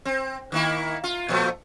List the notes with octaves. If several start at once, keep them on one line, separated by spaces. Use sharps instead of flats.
C4
D#3 A#3 E4
F4
A#2 F3 A3